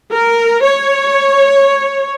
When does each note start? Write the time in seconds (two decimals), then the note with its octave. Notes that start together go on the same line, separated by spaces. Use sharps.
0.12 A#4
0.64 C#5